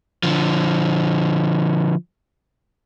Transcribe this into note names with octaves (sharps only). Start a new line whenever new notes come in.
D3 F3